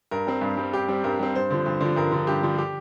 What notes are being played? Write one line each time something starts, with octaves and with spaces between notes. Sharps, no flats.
G2 A#4
G3 C4
G2
G3 C4
G2 G4
G3 C4
G2 A#4
G3 C4
G2 C5
D3 F3
G2
D3 F3
G2 A#4
D3 F3
G2 G4
D3 F3
G4